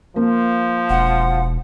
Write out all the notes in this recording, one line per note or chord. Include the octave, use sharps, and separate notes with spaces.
F3 A#3
E1 F#5